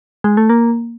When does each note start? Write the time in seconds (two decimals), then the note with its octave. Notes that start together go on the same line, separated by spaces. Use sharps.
0.24 G#3
0.37 A3
0.49 A#3